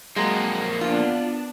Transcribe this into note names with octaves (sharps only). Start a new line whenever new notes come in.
F2 F#3 G#3 A#3
B3 D4 F4